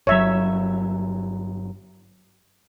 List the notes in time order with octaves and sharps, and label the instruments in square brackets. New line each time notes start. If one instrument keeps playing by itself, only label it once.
[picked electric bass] G1 F#3 [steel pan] C#5 E5